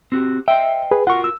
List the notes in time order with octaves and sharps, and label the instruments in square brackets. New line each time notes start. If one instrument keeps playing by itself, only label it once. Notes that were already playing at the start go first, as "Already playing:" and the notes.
[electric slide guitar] C4 F#4 G4
[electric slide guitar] C5 D#5 G5 [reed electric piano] E5
[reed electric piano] G#4 B4
[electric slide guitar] F4 F#4 A#4 [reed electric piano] F#5 C#6
[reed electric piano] E6